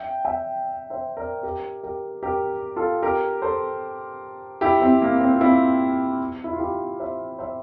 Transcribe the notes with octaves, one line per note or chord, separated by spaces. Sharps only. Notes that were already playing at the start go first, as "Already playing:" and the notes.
Already playing: E5 G5
E5 G5
C5 E5
A#4 D5
G4 A#4
G4 A#4
G4 A#4
F4 A4
G4 A#4
A4 C5
E4 G4
C4 E4
A#3
C4
F4
C4 E4
E4
F4
E4 G4
C5 E5
C5 E5